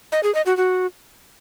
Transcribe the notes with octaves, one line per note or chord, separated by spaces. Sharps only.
D#5
G#4
D#5
F#4
F#4